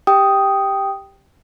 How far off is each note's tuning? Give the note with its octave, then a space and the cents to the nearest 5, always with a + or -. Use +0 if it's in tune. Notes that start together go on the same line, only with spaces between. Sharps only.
G4 +5 G5 +0 D#6 +0